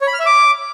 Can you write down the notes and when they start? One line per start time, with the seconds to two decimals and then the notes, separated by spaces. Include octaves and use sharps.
0.01 C#5
0.07 B5
0.13 F6
0.20 E5
0.26 D6